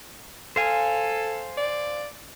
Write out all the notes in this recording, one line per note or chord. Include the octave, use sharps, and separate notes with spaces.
A4 C5 F5 G#5
D5